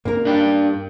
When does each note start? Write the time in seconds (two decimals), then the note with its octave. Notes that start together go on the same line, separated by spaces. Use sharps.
0.05 G2 A#3 C#4 A#4
0.25 D4 G4